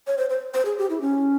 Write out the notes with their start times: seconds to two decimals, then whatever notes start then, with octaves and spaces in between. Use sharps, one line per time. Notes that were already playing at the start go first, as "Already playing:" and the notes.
0.07 C#5
0.18 C5
0.30 C5
0.54 C5
0.65 G#4
0.78 G4
0.90 E4
1.01 C#4